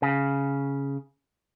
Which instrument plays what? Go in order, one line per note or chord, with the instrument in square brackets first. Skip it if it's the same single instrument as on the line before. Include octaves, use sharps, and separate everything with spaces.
[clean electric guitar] C#3